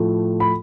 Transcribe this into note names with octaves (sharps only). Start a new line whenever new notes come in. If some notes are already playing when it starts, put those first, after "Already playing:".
Already playing: A2 F3 A3
B5